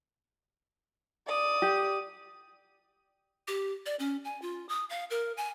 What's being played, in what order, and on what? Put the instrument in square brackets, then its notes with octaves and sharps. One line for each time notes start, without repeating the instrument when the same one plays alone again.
[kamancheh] D5 D#6
[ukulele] G4
[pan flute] G4
D5
C#4
G#5
F4
D#6
F5
A#4
G#5